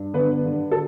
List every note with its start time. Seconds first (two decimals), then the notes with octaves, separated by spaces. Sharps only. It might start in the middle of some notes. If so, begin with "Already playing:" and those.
Already playing: G2
0.14 D3 B3 B4
0.46 D3
0.71 A4